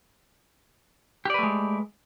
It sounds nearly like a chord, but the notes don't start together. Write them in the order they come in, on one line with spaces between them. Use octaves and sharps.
G4 D5 B4 A3 G#3